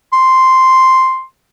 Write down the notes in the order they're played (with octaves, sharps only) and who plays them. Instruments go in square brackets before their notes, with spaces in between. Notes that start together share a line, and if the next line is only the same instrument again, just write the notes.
[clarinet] C6